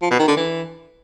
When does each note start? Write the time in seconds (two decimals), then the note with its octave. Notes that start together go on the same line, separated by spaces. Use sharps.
0.02 F3
0.11 B2
0.19 D#3
0.28 D3
0.37 E3